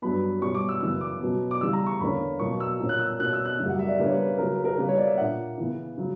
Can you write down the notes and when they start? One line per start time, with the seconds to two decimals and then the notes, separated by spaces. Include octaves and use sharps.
0.02 G2 F#3 B3 B5
0.42 B2 G3 C#4 C#6
0.55 D6
0.69 E6
0.81 F#2 C#3 E3 B3 E6
1.01 D6
1.20 B2 F#3 B3
1.51 D6
1.61 C#3 E3 G3 E6
1.73 A#5
1.86 C#6
2.00 E2 D3 A#3 C#4 B5
2.39 B2 F#3 A#3 C#6
2.60 E6
2.80 A#2 A#3 C#4
2.89 F#6
2.99 E6
3.08 F#6
3.19 B2 A#3 C#4 F#6
3.33 E6
3.45 F#6
3.59 F#2 C#3 G3 A#3
3.69 F#5
3.79 E5
3.88 D5
3.98 C#3 G3 A#3 D4 B4
4.05 C#5
4.14 B4
4.38 C#3 F#3 C#4 A#4
4.52 B4
4.65 A#4
4.77 C#3 G3 A#3 B4
4.89 C#5
4.98 D5
5.07 E5
5.17 A#2 A#3 D4 F#5
5.58 C#3 E3 B3
5.98 C#3 F#3